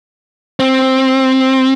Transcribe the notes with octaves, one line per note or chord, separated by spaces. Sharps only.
C4